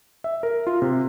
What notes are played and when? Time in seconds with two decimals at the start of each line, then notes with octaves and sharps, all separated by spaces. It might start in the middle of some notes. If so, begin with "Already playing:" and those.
0.24 E5
0.43 A#4
0.67 F4
0.82 C3